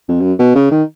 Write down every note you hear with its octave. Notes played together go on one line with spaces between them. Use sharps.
F2
F#2
B2
C#3
D#3